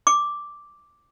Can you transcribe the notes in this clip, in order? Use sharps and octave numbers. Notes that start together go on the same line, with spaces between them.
D6